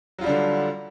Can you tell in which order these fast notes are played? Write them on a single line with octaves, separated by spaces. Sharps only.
F#3 F4 G3 D4 D3